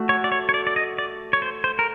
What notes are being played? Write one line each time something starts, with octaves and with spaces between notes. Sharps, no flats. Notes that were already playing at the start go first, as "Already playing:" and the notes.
Already playing: A3 F#4
C#5
D5
C#5
C#5
D5
D5
D#5
D5
C#5
C5
C5
A#4